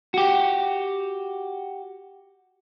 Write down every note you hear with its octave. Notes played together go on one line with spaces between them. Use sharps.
F#4 G4